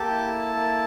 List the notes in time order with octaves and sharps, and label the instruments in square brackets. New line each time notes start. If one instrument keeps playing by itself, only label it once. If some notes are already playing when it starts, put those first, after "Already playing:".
Already playing: [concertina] A#3 G4 A4 A5
E4
A#3